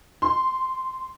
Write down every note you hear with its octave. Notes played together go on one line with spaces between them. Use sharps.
C6